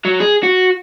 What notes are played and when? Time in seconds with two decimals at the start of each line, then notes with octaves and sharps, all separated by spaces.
0.05 F#3
0.20 G#4
0.43 F#4